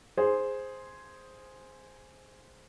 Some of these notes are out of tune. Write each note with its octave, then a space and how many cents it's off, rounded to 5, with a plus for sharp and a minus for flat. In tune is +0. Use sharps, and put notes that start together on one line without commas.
G#4 +0 C5 +0